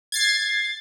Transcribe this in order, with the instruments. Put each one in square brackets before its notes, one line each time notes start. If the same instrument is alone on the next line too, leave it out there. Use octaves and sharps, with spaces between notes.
[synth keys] G#6 A6 C7